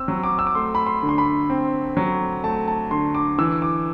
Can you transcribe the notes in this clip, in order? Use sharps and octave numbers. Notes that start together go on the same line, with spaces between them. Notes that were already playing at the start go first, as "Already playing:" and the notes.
Already playing: C4 E6
F#3
D6
E6
D6
A3 C6
B5
C6
D3
C6
B5
C4
F#3
A3 A5
A5
D3 C6
D6
E3 E6
D6